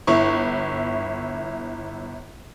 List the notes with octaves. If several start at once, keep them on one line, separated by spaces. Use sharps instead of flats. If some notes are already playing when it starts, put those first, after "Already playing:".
G1 E4 C#6